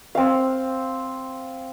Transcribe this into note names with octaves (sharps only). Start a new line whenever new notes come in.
C4 F5